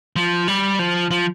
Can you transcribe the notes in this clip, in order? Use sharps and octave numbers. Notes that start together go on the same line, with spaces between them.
F3
G3
F3
F3